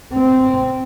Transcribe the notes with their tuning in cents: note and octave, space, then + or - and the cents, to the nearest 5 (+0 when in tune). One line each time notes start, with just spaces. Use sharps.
C4 -10